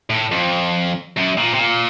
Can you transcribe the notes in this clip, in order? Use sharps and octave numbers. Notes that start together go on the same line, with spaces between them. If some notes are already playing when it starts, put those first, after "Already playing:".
A2
F2
F#2
A#2
C3
A#2